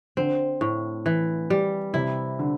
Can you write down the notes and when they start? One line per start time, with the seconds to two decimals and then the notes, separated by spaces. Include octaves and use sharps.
0.17 D3 C4
0.61 A2
1.06 E3
1.50 G3
1.94 C3 E4
2.39 D3